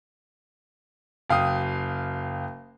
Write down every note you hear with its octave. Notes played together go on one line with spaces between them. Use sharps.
F#1 F5 G5 D#6